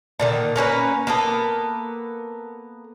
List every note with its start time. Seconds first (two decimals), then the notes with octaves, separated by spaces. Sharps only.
0.19 A#2 D3 D#3
0.56 A#3 C#4 G4 B4
1.07 A#3 B3 A4